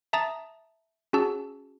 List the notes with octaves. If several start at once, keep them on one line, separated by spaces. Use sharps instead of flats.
E5 A5 A#5 D#6 A6
C#4 F#4 G#4 A5 E6